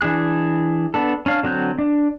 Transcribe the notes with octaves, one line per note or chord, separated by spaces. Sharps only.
E3 D4 G#4 F#6
B3 D4 A4
C#4 D4 F5
D3 F#3 C4 F#6 G6
D4